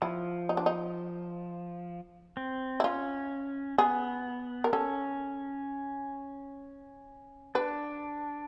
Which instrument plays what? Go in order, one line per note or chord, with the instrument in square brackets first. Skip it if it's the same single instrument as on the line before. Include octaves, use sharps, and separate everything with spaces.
[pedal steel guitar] F3 [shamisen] E4
[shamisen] D#4
D4
D#4
[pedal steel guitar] C4
[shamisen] E4
[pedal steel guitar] C#4 [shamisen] F4
[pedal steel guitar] B3 [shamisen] G#4
[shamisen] A#4
[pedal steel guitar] C#4 [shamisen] A4
[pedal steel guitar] D4 [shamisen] B4